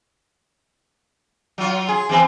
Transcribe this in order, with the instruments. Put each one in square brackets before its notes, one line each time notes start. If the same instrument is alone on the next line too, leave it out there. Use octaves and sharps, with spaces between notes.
[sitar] F#3 F4
G#4
E3 C4 B4